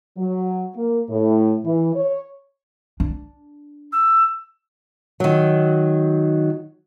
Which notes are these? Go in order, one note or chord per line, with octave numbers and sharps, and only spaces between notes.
F#3
A#3
A2
E3
C#5
D4
E6
D#3 F#3